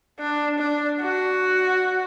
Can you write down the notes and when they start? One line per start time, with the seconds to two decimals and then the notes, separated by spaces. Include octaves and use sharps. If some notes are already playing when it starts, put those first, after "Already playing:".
0.19 D4
0.59 D4
1.01 F#4